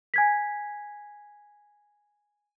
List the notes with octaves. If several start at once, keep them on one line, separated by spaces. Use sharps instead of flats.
G#5 G#6 B6